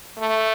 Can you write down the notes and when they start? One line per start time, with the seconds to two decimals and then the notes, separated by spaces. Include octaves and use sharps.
0.18 A3